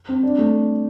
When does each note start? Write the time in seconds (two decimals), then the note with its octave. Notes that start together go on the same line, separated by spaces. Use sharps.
0.09 C4
0.23 D4
0.38 A3